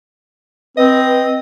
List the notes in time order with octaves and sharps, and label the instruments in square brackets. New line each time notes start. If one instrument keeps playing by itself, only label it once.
[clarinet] C4 [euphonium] B4 [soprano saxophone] D#5